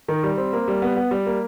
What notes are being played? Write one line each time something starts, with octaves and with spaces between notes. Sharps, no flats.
D#3
G3
C4
A#3
G3
B3
B3
G3
A#3